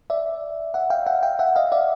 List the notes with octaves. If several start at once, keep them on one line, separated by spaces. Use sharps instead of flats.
D5 E5
E5 F#5
F5 G5
E5 F#5
F5 G5
E5 F#5
D#5 F5
D5 E5